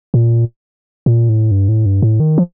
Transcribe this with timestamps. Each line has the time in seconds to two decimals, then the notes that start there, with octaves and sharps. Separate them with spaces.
0.14 A#2
1.06 A#2
1.29 A2
1.51 G2
1.69 A2
1.86 G2
2.02 A2
2.20 D#3
2.38 F3